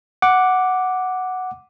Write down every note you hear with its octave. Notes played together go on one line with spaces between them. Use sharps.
F#5 D6